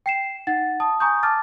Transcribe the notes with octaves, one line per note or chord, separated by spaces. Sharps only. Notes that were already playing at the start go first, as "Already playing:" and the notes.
G5 C7 E7
D#4 F#5 A6
A5 D#6
G#5 A#5 C#6 D#6 G6
A5 D6 F6 A6